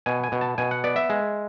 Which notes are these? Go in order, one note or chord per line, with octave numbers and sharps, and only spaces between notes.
B2 G#5
G#5
B2
A5
B2 G#5
F#5
B3 D5
E5
G#3